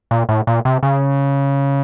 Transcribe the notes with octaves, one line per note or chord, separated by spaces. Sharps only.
A#2
A2
A#2
C3
C#3